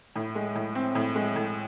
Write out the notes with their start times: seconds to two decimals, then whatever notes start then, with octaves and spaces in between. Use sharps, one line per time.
0.16 A2
0.35 G#3
0.55 A2
0.75 C4
0.95 A2
1.15 G#3
1.36 A2